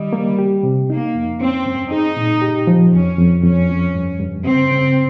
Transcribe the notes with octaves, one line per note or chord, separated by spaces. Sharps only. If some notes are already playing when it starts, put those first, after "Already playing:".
Already playing: D#3 G3 D#5
A#3
G4
C3
A#3 D#4
F2
C4 C#4
G2
D#4 G#4
A#2
G4
F3
F2 C#4
F2
F2 C#4
F2
G2
G2
C#3 C4
C#3